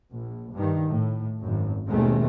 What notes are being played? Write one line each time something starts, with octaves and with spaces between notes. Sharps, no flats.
A#1
G2 D#3
A2
G#1 F#2
D#2 B2 D#3 G#3 A3 C4